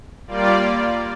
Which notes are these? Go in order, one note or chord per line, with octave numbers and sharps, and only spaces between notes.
G3 A#3 F4 D5